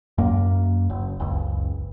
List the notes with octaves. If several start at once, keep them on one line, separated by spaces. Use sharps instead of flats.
F#2 A#3
F#1
F#1 C#2